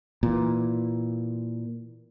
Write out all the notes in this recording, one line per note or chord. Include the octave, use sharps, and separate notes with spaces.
A#2 E3